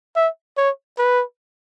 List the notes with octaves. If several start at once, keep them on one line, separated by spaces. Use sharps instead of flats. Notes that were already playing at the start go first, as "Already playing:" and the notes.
E5
C#5
B4